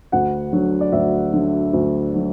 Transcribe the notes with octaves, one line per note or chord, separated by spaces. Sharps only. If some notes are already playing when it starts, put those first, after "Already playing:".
D2 F#5
D3 F#3
D5
D2 E5
D3 F#3
D2
D3 F#3